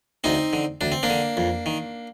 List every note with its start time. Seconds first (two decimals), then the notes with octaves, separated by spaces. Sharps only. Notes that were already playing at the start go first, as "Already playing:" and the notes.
0.24 D2 C4 D#4
0.53 D3
0.81 D2 D4
0.92 C4
1.03 A#3 D4
1.10 D3
1.37 F2
1.66 D#3